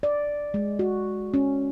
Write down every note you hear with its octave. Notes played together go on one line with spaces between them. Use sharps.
D5
G#3
F#4
C#4